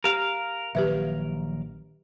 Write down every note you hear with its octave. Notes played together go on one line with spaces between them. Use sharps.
G4 A#4 F5
A#1 D#3 F#3 G4 B4 E5